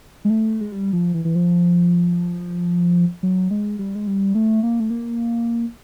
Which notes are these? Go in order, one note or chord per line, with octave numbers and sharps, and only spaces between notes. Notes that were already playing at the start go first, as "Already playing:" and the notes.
G#3
A3
G#3
G3
F3
E3
E3
F3
F#3
G#3
G3
G#3
G3
A3
A#3
A3
A#3